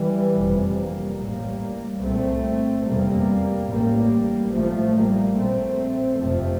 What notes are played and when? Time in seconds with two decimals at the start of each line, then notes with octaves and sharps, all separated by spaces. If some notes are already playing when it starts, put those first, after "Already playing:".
Already playing: E3 G3
0.35 F1 F2 C3
0.77 G3 A#3
1.19 A1 A2 G3 A#3
2.02 C2 A#2 A3 C4
2.86 F1 E2 C3 G3 A#3
3.68 A1 A2 G3 A#3
4.52 A1 A2 F3 A3
4.94 G3 A#3
5.36 A#1 A#2 A3 C4
6.19 F1 F2 C3 F3 A3